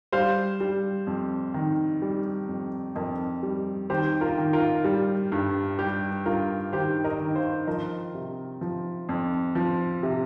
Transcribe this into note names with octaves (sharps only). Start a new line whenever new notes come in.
G3 C5 F5
G3
F2
D#3
G3
F2
F2 A#4 D#5
G3
D#3 G4 C5
F4 A#4
D#3
F4 A#4
G3
G2
G3 G4
G2 F4 A#4
D#3 G4 C5
A#4 D#5
D#3
C5 F5
F3 A#4 D#5
C3
F3
F2
F3
C3